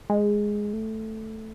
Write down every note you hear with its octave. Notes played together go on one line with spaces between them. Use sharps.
G#3
A3